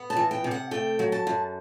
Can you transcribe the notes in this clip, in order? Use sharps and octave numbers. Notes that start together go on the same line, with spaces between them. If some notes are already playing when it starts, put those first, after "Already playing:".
Already playing: B3
A5
E3
G5
C3
F#5
A3 G5
F#3
A5
F#2